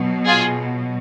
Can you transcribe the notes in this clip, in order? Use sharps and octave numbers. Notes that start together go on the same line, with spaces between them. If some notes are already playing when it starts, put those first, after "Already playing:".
Already playing: B2 F#3
F4 G#4